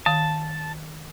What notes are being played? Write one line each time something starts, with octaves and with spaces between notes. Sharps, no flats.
D#3 F5 A5